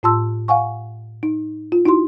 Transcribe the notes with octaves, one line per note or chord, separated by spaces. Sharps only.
A2 F4 A5 C6 E6
F5 F#5 G#5 C#6
D#4
F4
D#4 E4 F#4 C6